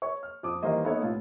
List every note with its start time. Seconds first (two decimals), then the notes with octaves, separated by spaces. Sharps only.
0.02 C#5 C#6
0.23 F6
0.43 F2 D6 D#6
0.62 D#3 E3 G3 A#3 C5 D#5
0.84 A#3 B3 D#4 A4 B4 C#5
1.03 C2 A2 F4